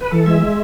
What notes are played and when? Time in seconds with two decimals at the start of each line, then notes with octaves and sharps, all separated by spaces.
0.01 B4
0.11 E3 A4
0.26 G#3 E5
0.41 G#3